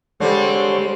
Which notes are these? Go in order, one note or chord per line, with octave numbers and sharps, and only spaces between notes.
D3 G3 G#3 C4 C5 C#5